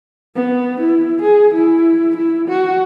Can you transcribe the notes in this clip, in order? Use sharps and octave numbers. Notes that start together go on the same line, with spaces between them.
B3
E4
G#4
E4
E4
F#4